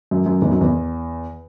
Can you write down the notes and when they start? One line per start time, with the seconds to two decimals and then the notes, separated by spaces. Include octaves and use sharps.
0.11 F#2
0.26 F#2
0.42 E2 G#2
0.51 F#2
0.61 E2